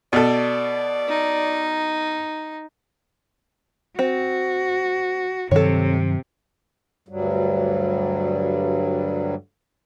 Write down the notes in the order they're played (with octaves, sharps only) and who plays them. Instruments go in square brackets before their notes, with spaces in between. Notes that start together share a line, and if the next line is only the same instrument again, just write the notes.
[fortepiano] B2 A4 [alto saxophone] D5
[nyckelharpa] D#4
[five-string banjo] C4 [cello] F#4
[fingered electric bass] G2 D#3 F#3 [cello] C3 [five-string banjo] A4 C#5
[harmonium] D2 G2 F#3 G3